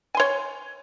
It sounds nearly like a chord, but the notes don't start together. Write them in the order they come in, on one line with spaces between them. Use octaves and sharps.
G#5 C6 C#5